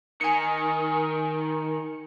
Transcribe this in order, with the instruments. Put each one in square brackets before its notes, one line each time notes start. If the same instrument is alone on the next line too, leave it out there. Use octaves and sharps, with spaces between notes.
[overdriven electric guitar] D#3 [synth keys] G#5 C#7